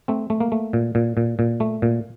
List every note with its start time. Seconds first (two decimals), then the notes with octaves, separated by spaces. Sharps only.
0.08 A3 C4
0.30 A3
0.40 A#3
0.52 A3
0.73 A#2
0.95 A#2
1.17 A#2
1.39 A#2
1.60 A3
1.82 A#2